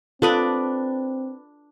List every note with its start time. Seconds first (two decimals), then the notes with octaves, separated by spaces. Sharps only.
0.22 C4 D4 F4 A4 B4 D5 D#6